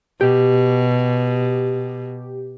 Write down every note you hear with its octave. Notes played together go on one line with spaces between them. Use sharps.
B2 G4